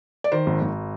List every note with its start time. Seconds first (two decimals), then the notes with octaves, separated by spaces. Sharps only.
0.24 D5
0.32 D#3 C5
0.46 G#1
0.62 G#1